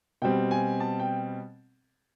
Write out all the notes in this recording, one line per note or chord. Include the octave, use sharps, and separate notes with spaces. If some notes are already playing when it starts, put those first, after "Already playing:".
B2 G3 C4 G5
G#5
A5
G5